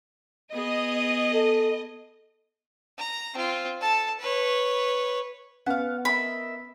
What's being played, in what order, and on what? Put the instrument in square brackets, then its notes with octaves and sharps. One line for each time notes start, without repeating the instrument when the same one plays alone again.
[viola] B3 G#4 [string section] D#5
[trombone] A4
[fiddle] A#5
C4 F4
A4 A5
B4 C#5
[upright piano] B3 [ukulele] C#4 [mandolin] F5 F#5
[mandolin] A#4 D#5 E5 [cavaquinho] B5